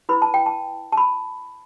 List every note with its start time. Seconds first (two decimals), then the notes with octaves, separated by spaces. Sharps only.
0.09 E4 B4 B5
0.22 A5
0.34 G5
0.46 A5
0.92 A5
0.97 B5